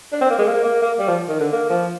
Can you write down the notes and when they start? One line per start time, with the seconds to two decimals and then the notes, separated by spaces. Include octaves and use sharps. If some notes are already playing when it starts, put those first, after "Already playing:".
0.12 D4
0.21 C4
0.30 A#3
0.38 G#3
0.47 A#3
0.64 A#3
0.82 A#3
0.99 G3
1.08 F3
1.29 D#3
1.40 D3
1.52 A#3
1.69 F3